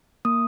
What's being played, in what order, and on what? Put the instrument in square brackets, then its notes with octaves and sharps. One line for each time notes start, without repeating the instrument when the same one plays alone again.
[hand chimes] A#3 D#6